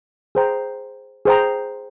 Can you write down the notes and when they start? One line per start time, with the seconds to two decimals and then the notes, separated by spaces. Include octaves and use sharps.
0.35 G#4 C5 G5 A#5
1.25 G#4 C5 G5 A#5